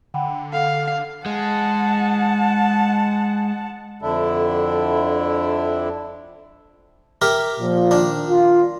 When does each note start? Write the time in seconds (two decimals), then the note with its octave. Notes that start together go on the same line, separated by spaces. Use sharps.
0.14 D3 F#5 G5 B5
0.53 A4 F5 F#5
1.26 G#3 F#5 A5
4.02 F2 D3 D4 E4
7.22 G4 A#4 E5
7.60 A#2 F3
7.91 D#3 D4
8.30 F4